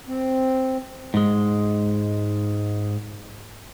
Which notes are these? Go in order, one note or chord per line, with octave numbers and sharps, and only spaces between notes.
C4
G#2 G#3